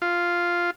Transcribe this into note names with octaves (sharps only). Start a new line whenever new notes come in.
F4